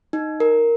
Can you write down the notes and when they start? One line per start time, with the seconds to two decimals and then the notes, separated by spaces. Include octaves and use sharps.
0.13 D#4
0.40 A#4